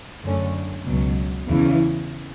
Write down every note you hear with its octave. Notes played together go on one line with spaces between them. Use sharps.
F#2 D3 A3 C#4
C#2 B2 F#3
E2 C#3 E3